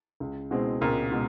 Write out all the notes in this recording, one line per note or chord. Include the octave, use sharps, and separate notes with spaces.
C#2
B2 G#3 C4 E4
C#2 A#2
B2 G#3